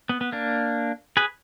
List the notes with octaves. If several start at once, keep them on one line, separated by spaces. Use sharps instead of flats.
B3
B3
A#3 D4
G#4 B4